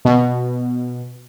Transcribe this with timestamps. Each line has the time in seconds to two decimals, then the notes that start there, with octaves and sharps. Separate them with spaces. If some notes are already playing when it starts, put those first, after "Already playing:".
0.05 B2